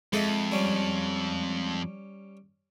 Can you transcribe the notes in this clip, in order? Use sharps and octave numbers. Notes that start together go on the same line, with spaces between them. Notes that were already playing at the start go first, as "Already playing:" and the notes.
F2 G#3 A4 D#5 E5
G3 C#4